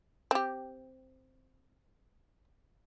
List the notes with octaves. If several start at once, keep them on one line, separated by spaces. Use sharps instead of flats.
C4 G4